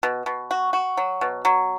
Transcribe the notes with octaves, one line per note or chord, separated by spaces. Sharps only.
B2
B2
F#4
F#4
F#3
B2
F#3